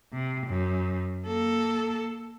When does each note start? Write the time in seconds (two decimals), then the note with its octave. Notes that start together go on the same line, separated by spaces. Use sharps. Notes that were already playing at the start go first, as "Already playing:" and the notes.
0.13 C3
0.47 F#2
1.26 A#3 A4